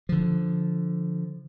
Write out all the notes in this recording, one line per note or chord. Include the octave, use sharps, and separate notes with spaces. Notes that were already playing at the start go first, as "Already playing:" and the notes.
D3 F3